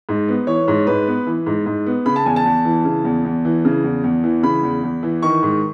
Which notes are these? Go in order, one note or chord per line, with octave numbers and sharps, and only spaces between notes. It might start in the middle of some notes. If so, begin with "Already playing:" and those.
G#2
B3
E3 C#5
G#2
G#2 B4
B3
E3
G#2
G#2
B3
C#3 B5
A5
E2 G#5
A5
E2
E3
C#3
E2
E2
E3
C#3
E2
E2
E3
C#3 B5
E2
E2
E3
D#3 C#6
G#2